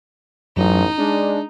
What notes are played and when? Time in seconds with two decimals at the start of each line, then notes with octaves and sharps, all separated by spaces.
0.56 A1 F#2 D#4
0.98 G#3 D4